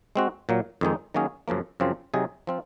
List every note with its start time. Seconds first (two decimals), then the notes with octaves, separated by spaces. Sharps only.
0.16 G#3 C4 F#4
0.49 A#2 F#3 A#3
0.81 F2 D#3 G#3 D#4
1.14 D#3 F#3 A#3 C#4 G#4
1.48 F#2 C#3 F3 A#3
1.80 F#2 C#3 F3 C4 F4
2.14 C3 F#3 C4 D#4 G#4
2.47 F3 C4 F4